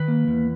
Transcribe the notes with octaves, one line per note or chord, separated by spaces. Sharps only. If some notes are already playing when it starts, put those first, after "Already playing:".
Already playing: D#3 B4
A#3
E2